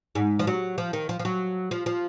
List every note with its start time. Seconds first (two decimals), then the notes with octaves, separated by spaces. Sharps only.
0.15 G#2
0.39 F3
0.47 F#3
0.78 F3
0.93 D#3
1.09 F3
1.19 F3
1.25 F#3
1.71 F3
1.86 F3